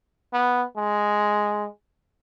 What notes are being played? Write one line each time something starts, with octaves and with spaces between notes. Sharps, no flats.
B3
G#3